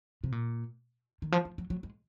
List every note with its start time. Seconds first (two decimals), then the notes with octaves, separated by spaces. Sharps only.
0.24 C3
0.32 A#2
1.22 D#3
1.32 F3
1.45 F3
1.58 F#3
1.70 F#3
1.83 G#3